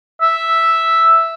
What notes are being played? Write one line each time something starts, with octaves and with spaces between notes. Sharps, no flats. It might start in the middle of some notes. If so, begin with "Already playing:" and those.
E5